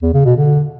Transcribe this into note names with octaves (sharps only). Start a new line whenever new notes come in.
E2
C#3
B2
D3